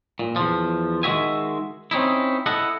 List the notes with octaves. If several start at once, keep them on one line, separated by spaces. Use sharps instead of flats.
A#2
E2 F3
D#3 G#3 D#4 F#4 E5 G#5
C4 C#4 D#4 E4
E4 A4 D#5 F#5